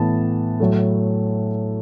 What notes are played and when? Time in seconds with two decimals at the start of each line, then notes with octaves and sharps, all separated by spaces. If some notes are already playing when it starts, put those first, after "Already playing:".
Already playing: A2 E3 B3 A5
0.60 A2 F#3 A3